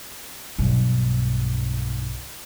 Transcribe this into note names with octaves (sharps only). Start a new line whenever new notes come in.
B1 G2